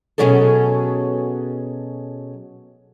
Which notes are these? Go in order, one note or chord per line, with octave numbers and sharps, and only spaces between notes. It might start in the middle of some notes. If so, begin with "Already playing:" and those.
B2 D#3 F#3 C#4 G#4 A4